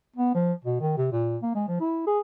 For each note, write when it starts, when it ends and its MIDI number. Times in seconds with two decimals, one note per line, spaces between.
0.16 0.34 59
0.34 0.53 53
0.64 0.80 47
0.81 0.96 51
0.97 1.08 48
1.12 1.37 46
1.42 1.51 58
1.55 1.65 56
1.68 1.79 53
1.80 2.04 64
2.07 2.19 68